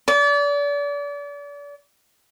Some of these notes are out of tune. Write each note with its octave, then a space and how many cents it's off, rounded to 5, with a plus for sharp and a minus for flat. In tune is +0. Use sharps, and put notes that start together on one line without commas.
D5 -35